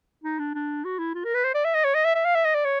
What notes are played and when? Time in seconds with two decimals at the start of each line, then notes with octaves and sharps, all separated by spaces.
0.24 D#4
0.39 D4
0.54 D4
0.85 F#4
0.99 E4
1.15 F4
1.25 A#4
1.35 B4
1.44 C5
1.55 D5
1.65 E5
1.75 D#5
1.85 C#5
1.95 D#5
2.05 E5
2.15 E5
2.25 F5
2.35 E5
2.45 D#5
2.55 D5
2.65 C#5